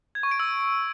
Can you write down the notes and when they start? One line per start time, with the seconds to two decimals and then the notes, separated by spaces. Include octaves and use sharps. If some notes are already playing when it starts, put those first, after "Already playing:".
0.15 G#6
0.23 C#6
0.31 D7
0.40 E6